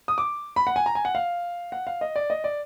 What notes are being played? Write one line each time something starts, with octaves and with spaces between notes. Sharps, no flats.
D#6
D6
B5
F#5
G#5
A#5
G#5
F#5
F5
F#5
F5
D#5
D5
D#5
D5